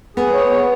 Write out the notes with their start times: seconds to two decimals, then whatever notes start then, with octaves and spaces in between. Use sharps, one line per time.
0.17 B3 G#4
0.34 C#5
0.51 B3